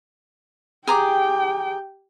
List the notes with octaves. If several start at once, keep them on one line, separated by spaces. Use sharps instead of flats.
G4 G#4 G5 A#5 D6